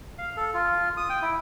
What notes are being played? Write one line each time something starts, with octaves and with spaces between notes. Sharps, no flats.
F5
A4
F4
D#6
G5
E4